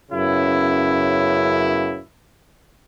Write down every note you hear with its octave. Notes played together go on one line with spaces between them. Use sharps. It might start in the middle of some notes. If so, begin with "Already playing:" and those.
F#2 C#3 B3 E4